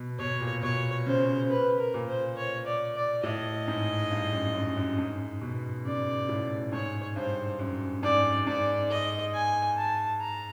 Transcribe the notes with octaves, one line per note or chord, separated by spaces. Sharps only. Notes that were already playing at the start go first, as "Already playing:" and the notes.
Already playing: B2
B2 C#5
A#2
B2 C#5
C#3 C5
B4
A#4
A#2
C5
C#5
D5
D5
A2 D#5
G#2
G2
F#2
F#2
F#2
G#2
B2
C#3 D5
A2
G#2 C#5
G2 C5
F#2
G#2 D5
G#2 D5
D#5
G#5
A5
A#5